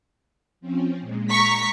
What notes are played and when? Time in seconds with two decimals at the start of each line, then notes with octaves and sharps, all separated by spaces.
0.61 F3 C4 C#4
1.00 A#2 G#3
1.30 A#5 C#6 B6